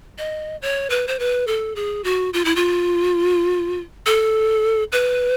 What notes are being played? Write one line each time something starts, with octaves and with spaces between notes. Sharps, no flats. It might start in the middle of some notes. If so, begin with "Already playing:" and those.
D#5
C#5
B4
C5
B4
A4
G#4
F#4
F4
E4
F4
A4
B4